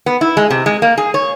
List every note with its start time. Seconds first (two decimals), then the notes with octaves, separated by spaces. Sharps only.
0.06 B3
0.21 E4
0.37 G#3
0.50 C3
0.66 G#3
0.82 A#3
0.97 G#4
1.14 C#5